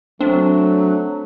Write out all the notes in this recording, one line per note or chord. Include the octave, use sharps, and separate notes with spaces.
F#3 A3 C4 D4